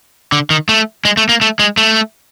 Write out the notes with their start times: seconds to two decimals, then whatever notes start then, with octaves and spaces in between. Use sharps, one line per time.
0.32 D3
0.50 D#3
0.69 A3
1.05 G#3
1.17 A3
1.29 A#3
1.41 A3
1.59 G#3
1.77 A3